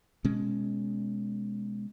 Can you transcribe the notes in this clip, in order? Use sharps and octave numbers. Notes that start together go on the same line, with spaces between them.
B2 G#3 C#4